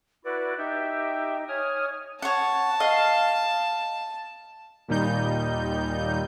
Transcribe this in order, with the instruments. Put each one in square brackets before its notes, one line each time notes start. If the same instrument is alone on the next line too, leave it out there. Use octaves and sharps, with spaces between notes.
[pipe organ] E4 F#4 D5 [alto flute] B4
[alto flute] D#4 [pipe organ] G4 E5 G5
[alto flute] C#5 [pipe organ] G#5 D#6 F6
[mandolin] C#5 F#5 [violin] A5
[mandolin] D#5 F5
[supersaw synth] D#2 A#2 G3 D#4 G6